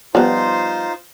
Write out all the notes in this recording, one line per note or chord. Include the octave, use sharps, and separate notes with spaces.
F3 G3 B3 D#4 F4 C5